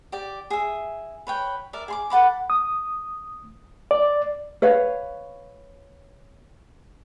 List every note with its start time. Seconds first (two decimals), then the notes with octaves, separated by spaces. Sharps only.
0.12 G4 D5
0.50 G#4 E5
1.27 B4 C#5 G5
1.73 A#4 D5 E5
1.88 G#4 C6 D6
2.10 A4 F#5 B5 D6
2.50 D#6
3.91 D5
4.62 B4 C#5 F5